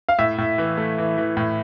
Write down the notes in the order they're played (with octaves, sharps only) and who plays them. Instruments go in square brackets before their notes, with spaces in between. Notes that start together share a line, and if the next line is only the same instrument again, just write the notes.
[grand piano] F5
A2 E5
A2
E3
A3
E3
E3
A2